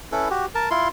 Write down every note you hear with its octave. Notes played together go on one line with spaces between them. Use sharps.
C#4 E4 A4 B4
F#4 G4
A#4 A5
E4 F4 C6